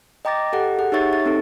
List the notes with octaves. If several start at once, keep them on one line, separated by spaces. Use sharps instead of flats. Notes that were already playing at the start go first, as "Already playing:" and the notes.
D#5 G5 A#5 D6 A6 A#6
G4 A4 F#5
G#4 F#5
D#4 G4 C#5 E5 C#6 A6
A6
C4 D#4 G4 A4